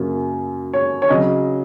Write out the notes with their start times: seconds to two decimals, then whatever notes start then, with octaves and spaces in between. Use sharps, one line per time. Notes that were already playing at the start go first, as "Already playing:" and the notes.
Already playing: F#2 C#3 F#3 A#3
0.74 C#5
1.02 C#5
1.09 C#3 F#3 D#5